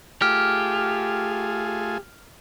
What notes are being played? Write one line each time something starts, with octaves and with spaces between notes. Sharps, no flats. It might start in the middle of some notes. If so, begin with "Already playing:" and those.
A3 F4 G4 G#4 F6